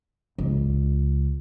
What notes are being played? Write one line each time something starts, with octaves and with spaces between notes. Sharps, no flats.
C#2